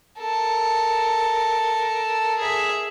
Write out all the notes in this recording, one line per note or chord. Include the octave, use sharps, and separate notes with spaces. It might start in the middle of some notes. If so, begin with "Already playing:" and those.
A4 A#4
G#4 E5